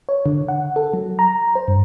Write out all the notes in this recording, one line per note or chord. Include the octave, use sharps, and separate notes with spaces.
C#5
D3
F#5
A4
F#3
A#5
C5
G2